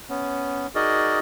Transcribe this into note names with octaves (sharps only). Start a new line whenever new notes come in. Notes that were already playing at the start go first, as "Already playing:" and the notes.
B3 C#4
D#4 F#4 G#4 A#4 D5 D#5